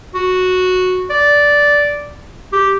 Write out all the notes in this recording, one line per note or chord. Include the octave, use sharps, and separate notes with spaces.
F#4
D5
G4